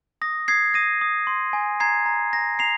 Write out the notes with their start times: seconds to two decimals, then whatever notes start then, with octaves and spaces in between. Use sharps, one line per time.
0.22 D#6 A#6
0.48 D#6 G#6 C7
0.74 D#6 A#6 D#7
1.01 D#6
1.27 C6
1.53 G#5
1.80 A#5 G#6 C7
2.06 A#5
2.33 A#5 A#6
2.59 A#5 C7 F7